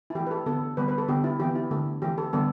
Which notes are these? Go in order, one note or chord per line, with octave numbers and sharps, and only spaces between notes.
E4
E3 A3 G4
B4
A4
D3 B3 A4
D3 G3 B3 B4
B4
A4
D3 B3 G4
E4
E3 B3 G4
E4
D3 A3
E3 A3 G4
A4
D3 G3 B3 A4